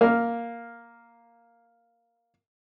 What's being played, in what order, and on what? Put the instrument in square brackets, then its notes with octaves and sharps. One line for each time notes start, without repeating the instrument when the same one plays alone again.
[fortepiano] A#3 F6